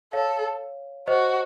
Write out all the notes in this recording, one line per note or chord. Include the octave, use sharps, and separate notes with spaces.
A4 C#5 F5
F#4 C5 D#5